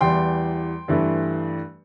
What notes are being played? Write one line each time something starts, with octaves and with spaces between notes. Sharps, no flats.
E2 E3 G3 G5 C6
G2 E3 A3